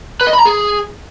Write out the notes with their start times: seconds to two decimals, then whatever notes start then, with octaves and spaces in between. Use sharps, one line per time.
0.21 B4
0.27 D#5
0.33 B5
0.39 A#5
0.45 G#4